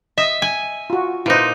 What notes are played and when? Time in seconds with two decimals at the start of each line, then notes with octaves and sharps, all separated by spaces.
0.18 D#5 E5
0.42 G#5
0.90 F4 F#4
1.26 A#2 D#4 E4 B4 C5